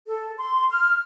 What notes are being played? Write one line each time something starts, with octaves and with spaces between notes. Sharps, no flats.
A4
C6
F6